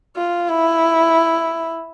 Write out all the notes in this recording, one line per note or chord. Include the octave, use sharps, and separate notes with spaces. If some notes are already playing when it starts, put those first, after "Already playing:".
F4
E4